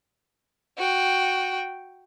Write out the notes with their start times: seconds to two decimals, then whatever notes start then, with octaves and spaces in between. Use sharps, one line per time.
0.78 F#4 G5